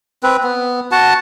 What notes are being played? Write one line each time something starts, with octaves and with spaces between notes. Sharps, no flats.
C4 B4
B3
F#4 F#5 A5